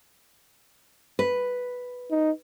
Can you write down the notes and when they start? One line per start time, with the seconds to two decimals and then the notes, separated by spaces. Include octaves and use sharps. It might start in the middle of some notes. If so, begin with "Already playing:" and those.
1.19 B4
2.11 D#4